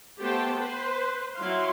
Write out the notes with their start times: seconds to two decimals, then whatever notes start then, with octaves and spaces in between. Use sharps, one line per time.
0.21 A3 B3 G4 C5 G5 A5
0.59 B4 C5
1.36 F#3 E4 F5 C6